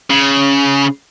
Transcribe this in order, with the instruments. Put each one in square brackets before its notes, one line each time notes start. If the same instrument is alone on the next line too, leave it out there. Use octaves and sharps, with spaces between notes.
[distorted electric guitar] C#3